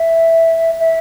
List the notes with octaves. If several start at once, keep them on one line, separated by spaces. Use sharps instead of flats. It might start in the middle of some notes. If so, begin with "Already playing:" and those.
Already playing: E5
E5